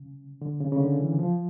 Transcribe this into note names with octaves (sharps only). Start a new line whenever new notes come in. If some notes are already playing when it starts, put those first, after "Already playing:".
Already playing: C#3
D3
C#3
C#3
D3
E3
F3